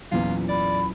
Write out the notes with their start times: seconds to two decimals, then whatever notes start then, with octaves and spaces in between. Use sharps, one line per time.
0.12 E2 A#2 F#3 C#4 E4 F4
0.49 D5 B5